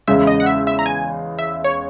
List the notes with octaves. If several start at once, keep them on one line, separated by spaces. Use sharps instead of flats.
E2 C#3 G#3 E5
D#5
F#5
E5
E5
A#5
G#5
E5
C#5